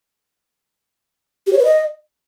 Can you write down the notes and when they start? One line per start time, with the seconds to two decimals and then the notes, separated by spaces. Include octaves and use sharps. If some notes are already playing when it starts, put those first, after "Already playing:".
1.47 G4
1.53 C#5
1.59 B4
1.65 D#5